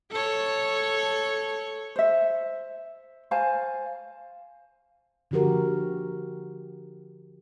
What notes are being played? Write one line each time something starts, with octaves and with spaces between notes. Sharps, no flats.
A4 C#5
C5 E5
C5 F5 G#5 A5
D3 F3 F#4 G4 A#4